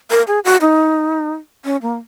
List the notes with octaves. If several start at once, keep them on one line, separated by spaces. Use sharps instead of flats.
A#4
G#4
F#4
D#4
C#4
A#3